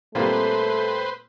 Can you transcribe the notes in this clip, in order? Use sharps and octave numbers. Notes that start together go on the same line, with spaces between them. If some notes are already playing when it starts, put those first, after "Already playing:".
A#2 G3 A3 A#3 C4 F4 B4 C5